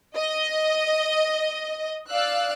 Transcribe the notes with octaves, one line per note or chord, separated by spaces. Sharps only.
D#5
D5 F5 E6 F#6